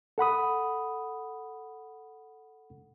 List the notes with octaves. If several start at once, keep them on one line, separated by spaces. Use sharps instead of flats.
A4 F#5 B5 D#6